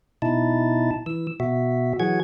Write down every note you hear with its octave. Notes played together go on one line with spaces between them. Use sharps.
B2 D#4 E4 A5
E3 E6
B2 F#4 E5
E3 F#3 F#4 G#4 F#5 G#6